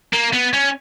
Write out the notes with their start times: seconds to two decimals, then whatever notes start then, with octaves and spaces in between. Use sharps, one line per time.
0.13 A#3
0.33 B3
0.54 C#4